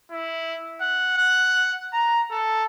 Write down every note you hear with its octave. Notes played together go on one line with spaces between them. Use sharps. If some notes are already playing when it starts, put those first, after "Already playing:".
E4
F#5
F#5
A#5
A4